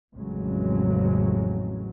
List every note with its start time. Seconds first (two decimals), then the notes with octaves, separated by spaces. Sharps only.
0.15 A1 F2 C#3 F#3 G#3